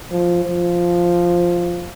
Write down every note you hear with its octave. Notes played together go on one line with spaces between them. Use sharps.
F3
F3